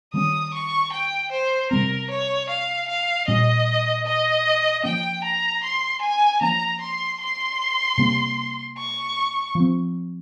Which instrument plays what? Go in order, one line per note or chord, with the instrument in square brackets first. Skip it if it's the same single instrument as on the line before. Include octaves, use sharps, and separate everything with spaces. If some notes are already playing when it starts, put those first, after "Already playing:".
[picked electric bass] D#3 G3 A#3 C#4 [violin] D#6
[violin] C#6
G5
C5
[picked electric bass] C3 G3 C4 [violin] A#4
[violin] C#5
F5
F5
[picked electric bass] A#2 G3 C#4 [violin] D#5
[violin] D#5
[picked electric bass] F3 A#3 C#4 [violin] G5
[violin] A#5
C6
G#5
[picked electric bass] F3 A#3 C#4 [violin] A#5
[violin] C6
C6
[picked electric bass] C3 G3 A#3 C#4
[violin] C#6
[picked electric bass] F3 C4